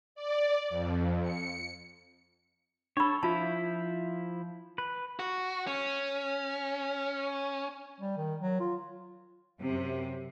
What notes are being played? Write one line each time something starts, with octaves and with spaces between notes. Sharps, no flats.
D5
F2
C#7
D4 A4 C#5 B5
F3 E4 F4 A5
B4
F#4
C#4
G3
D#3
F#3
F4
F#2 C3